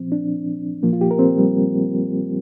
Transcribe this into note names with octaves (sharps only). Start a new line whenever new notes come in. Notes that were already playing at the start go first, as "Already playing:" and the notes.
Already playing: A#2 F3 C4
D4
A#2 F3 A#3
F4
G4
A#4
C4
G3